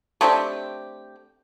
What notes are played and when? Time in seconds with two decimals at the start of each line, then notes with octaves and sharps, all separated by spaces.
0.21 A3 C4 D4 G4